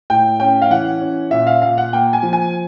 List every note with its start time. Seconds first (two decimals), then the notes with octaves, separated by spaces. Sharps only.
0.10 A2 G5
0.40 C#4 G5
0.62 F5
0.70 E3 F#5
1.01 C#4
1.31 A#2 E5
1.47 F5
1.62 A#2 F5
1.78 F#5
1.93 A#3 G5
2.13 G#5
2.23 F3
2.33 G#5